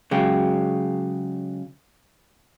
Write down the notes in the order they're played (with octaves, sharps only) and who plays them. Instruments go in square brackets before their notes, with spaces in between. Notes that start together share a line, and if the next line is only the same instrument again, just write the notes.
[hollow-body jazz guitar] C#3 F#3 G#3 G4